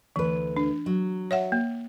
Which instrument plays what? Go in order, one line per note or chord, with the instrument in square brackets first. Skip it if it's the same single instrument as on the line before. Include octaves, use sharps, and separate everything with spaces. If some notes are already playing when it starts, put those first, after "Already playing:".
[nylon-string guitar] D2 B4 [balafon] E3
[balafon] D4
[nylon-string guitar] F#3
[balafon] C#5 E5 F#5
A#3